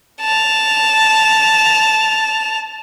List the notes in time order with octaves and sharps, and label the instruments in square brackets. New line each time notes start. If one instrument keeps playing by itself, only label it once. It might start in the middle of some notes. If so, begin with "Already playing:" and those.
[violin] A5 F7